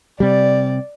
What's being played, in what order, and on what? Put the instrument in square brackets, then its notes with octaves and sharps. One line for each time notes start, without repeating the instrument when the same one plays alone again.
[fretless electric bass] C3 G3 [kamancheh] D5